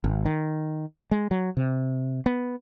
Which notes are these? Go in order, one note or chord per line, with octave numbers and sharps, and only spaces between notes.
G#1
D#3
G#3
F#3
C3
B3